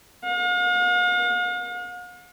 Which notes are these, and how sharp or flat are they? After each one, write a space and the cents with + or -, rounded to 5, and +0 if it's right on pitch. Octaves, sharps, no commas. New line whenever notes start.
F5 +45